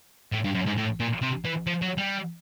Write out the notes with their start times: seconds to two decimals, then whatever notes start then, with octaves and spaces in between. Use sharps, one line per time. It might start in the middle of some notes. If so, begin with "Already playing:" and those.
0.32 A2
0.44 G2
0.54 F#2
0.66 G#2
0.77 A2
1.00 A#2
1.22 C3
1.45 E3
1.67 F3
1.82 F#3
1.98 G3